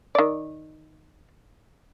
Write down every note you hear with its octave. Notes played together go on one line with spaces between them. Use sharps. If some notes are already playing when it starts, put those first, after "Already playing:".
D#3 D5